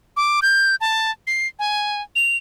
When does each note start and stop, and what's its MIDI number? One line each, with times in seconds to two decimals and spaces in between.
0.17 0.40 86
0.42 0.75 91
0.81 1.10 81
1.27 1.47 96
1.59 2.02 80
2.16 2.37 101